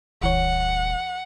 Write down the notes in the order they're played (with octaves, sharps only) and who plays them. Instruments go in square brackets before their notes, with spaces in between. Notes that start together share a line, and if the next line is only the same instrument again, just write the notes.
[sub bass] D#1 [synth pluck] C#2 E3 C#5 [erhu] F#5